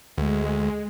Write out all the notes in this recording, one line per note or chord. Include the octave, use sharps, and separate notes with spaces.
D2 G#3